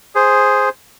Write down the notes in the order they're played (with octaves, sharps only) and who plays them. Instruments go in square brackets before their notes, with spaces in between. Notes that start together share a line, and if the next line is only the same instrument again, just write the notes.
[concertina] G#4 C5